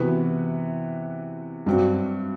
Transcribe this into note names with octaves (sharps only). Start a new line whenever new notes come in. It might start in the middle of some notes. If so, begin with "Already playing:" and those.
Already playing: C3 E3 B3 F#4 B4
G2 F#3 C4 F#4